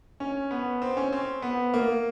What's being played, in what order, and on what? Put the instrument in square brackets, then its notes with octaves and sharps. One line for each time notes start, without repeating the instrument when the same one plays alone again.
[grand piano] C#4
B3
C4
C#4
C4
B3
A#3